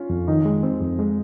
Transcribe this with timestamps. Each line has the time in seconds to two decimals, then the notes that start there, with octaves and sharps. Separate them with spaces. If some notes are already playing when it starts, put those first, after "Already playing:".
Already playing: C#4 F4
0.10 F2
0.27 D#3 D#4
0.45 G#3
0.63 C4
0.81 F2
0.99 G#3